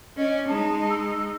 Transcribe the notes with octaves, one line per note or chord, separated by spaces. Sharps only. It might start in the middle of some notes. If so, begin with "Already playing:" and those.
C#4 D5 D#5
G#3 D#4 A5
E6